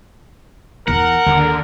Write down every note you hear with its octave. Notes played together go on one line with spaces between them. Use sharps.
E2 E3 A#4 F#5
D#2 D3